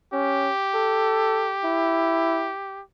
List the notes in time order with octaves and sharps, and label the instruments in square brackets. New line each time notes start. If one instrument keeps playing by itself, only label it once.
[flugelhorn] C#4 [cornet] G4
[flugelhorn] A4
E4